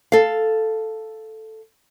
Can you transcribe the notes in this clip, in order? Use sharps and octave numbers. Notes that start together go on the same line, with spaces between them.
A4 F5